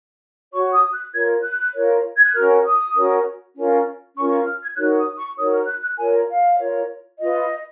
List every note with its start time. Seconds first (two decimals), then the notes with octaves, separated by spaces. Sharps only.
0.53 F#4 C#5 C#6
0.72 D#6
0.94 F#6
1.14 F4 A#4 C#5 G#6
1.43 F#6
1.74 F4 A#4 C#5
2.17 G#6
2.25 F#6
2.34 C#4 F#4 A#4 F6
2.64 D#6
2.95 C#4 F#4 A#4
3.56 C#4 F4 A#4
4.16 C#4 F4 A#4 C#6
4.31 C#6
4.46 F6
4.62 G#6
4.76 D#4 F#4 A#4 C#5 F#6
4.97 D#6
5.17 C#6
5.37 D#4 F#4 A#4 C#5 D#6
5.53 F6
5.67 F#6
5.83 F#6
5.97 F4 A#4 C#5 G#5
6.28 F5
6.59 F4 A#4 C#5
7.19 F4 B4 D#5